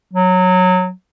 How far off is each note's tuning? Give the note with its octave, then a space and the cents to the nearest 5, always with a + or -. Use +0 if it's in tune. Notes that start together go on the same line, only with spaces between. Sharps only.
F#3 -15